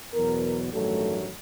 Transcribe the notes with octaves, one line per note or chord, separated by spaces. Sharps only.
E2 B2 F#3 A#4
A1 G2 D#3 F#3 A3 A4